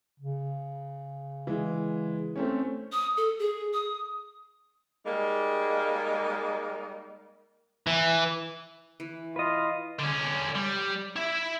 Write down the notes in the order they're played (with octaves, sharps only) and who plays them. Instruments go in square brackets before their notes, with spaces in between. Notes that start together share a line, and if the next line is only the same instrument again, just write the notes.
[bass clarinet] C#3
[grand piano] E3 G#3
A3 C4 C#4
[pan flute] D#6
A4
G#4
D#6
[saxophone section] G3 G#3 A#3 D#4
[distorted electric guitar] E3
[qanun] E3
[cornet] F4 [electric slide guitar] B4 D#5
[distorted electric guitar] D3 C#4
G3
E4 E5